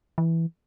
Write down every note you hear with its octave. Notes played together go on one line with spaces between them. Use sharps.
E3